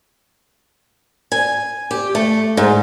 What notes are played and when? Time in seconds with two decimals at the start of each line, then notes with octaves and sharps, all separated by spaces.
1.32 G#5
1.91 G4
2.15 A3
2.57 G#2